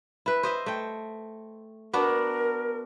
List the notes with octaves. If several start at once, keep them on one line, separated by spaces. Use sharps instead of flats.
E4 B4
C5 D#5 E5
A3 G5
B3 D4 F#4 A#4